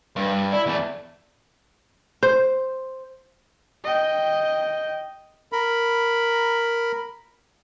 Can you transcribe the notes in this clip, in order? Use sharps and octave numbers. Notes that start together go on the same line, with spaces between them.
G2
E4 D5
E2 A3
C5
D#5 G5
A#4 B5